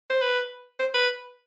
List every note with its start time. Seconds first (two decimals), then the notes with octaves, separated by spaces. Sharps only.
0.10 C5
0.22 B4
0.79 C5
0.94 B4